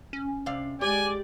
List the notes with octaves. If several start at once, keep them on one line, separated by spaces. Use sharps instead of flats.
C#4
C3 D5 F5
G#3 G4 D5 G#5